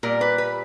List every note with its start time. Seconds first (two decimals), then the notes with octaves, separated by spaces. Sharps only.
0.03 A#2 G3 A#4
0.21 B4
0.38 B4